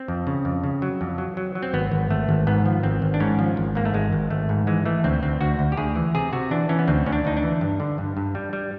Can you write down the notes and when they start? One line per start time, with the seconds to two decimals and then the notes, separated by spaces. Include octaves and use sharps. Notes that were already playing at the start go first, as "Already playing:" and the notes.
Already playing: C4
0.08 F2
0.27 C#3
0.45 F2
0.64 C#3
0.82 F#3
1.01 F2
1.18 F#3
1.37 F#3
1.55 F#3
1.62 C4
1.73 G#1 B3
1.92 G#1
2.10 G#1 A3
2.29 G#1
2.47 G#2 B3
2.66 F3
2.83 G#1 C4
3.02 G#1
3.14 D4
3.20 G#2 C#4
3.39 F3
3.57 G#1
3.75 G#2 A#3
3.85 A3
3.94 G#1 G#3
4.13 G#1
4.30 G#1 A3
4.49 G#2
4.67 E3 G#3
4.85 E3 A3
5.04 D2 C4
5.23 D2 C4
5.41 D2 F#4
5.59 D2
5.72 G4
5.77 D2 G#4
5.96 E3
6.15 C3 G#4
6.33 C3 F#4
6.51 E3 D4
6.69 E3 C#4
6.79 B3
6.88 D2 C4
7.06 D2 C#4
7.13 D4
7.25 D2 D#4
7.37 D4
7.43 E3
7.61 G2
7.80 D3
7.98 G2
8.17 G2
8.35 G3
8.53 G3